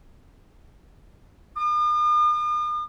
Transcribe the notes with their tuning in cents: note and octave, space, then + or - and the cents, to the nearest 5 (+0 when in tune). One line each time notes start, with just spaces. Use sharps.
D#6 -45